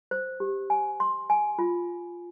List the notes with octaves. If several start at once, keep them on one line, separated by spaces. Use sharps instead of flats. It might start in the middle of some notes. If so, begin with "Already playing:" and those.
C5
G4
G#5
C6
G#5
F4